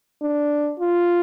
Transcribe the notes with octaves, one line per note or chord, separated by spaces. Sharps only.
D4
F4